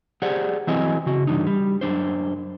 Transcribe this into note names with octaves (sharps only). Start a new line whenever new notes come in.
G4 G#4 C5 D5 F#5
E3 F#3 C4 E4 D#5 G#5
C#3 F#4
G2 C3 E3 D4 D#4
G3
F#2 C3 D4 C5